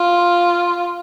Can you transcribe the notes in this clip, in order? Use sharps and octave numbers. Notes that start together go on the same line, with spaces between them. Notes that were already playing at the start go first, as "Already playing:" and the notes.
Already playing: F4